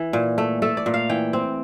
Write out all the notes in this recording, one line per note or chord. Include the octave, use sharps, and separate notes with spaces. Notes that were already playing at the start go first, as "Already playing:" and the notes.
Already playing: E3
A#2
A3
A3 A4
D5
A#2
F5
E3 G5
C4